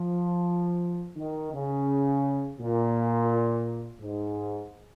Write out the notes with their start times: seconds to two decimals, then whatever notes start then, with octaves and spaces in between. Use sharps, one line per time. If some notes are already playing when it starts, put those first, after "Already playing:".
Already playing: F3
1.17 D#3
1.53 C#3
2.59 A#2
4.01 G#2